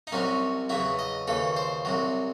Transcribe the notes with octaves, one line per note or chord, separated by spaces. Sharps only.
D#4
C2 C3 F#3 C#4
E2 C#3 F#3 E4
D#5
D#2 C#3 E3 A4
C5
C2 C3 F#3